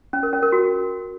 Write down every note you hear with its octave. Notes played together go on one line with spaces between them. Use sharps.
C#4
A#4
C#4
A#4
F#4